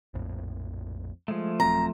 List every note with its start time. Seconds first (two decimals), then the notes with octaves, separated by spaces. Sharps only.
0.14 A#1 F2 A2
1.28 F3 G#3 A3
1.60 D#1 F#3 C4 A#5